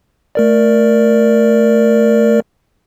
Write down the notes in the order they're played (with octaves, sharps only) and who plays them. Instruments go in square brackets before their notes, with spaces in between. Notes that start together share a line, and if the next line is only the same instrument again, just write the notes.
[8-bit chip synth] A3 A#4 D5